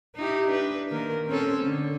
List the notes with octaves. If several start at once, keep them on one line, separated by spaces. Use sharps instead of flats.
D#4 E4 G4
D4 B4
D#3 A#3 A#4
C4 C#4 A4
D3